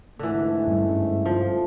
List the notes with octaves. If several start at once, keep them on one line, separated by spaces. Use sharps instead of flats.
G#2 D3 E3 A3
G2 G3 C#4
F3